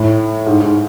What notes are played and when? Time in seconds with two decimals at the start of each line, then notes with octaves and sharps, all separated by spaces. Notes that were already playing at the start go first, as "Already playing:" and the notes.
Already playing: A2
0.47 G#2
0.61 G#2